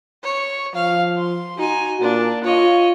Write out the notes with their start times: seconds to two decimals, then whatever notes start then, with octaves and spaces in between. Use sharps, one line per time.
0.24 C#5
0.75 F3 F5
1.17 C6
1.58 D#4 F#4 G#5
2.01 A#2 D4
2.44 F4 C#5 D#5